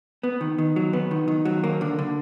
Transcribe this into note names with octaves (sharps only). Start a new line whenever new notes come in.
B3
D#3
D#3
F#3
B3
D#3
D#3
F#3
A#3
D3
D3